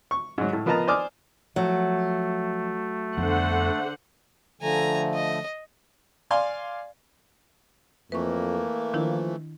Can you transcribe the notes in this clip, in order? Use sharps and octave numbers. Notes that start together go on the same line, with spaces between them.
C#6
G#2 F#3
A2
F3 B3 A#4 D#5 A5 A#5
C5 D5 G#5 D6 D#6 F6
F3 F#3 A3
F2 D3 F3 B3 C5 F#5
D3 F3 A3 G#5 A#5
D#5
D5 F5 G#5 C6
F2 E3 A3 A#3 B4 C#6
D#3 F3 D4 E4